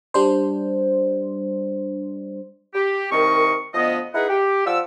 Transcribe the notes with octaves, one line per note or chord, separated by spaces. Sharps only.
G3 D4 C5
G4
C2 D#3 C4 A#4 D#5 C#6
D2 F3 B3 D#5
D#4 E4 G#4 B4 F#5
G4
F3 F4 D5 F#5 E6